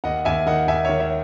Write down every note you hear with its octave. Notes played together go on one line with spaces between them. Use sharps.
D#2 D#5 F#5
D#2 E5 G#5
D#3 D#5 F#5
D#2 E5 G#5
D#3 C#5 E5
C#5 E5